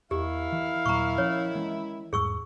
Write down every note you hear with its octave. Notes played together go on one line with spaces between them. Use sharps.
E2 D#3 E4 G4 F5
E3
D#2 A#2 F#3 A#5 C#6
F3 C#4 C#5
E3 G#3 C#4
E2 G#2 G#4 C#6 E6